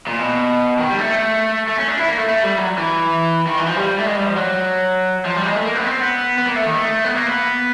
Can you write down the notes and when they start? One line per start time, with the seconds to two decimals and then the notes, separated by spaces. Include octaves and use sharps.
0.07 A#2
0.19 B2
0.78 D#3
0.89 G3
0.99 A3
1.68 A3
1.77 C#4
1.88 D4
1.98 E4
2.08 A#3
2.18 A3
2.28 A3
2.42 G3
2.57 F#3
2.78 E3
3.46 D#3
3.58 E3
3.66 F3
3.77 G3
3.99 A3
4.07 G#3
4.17 G3
4.26 F3
4.36 F#3
5.25 F3
5.36 G3
5.46 G#3
5.56 A3
5.66 A#3
5.75 B3
5.85 C4
6.01 B3
6.37 B3
6.46 A#3
6.55 A3
6.66 D#3
6.75 A3
7.04 B3
7.16 A#3
7.27 B3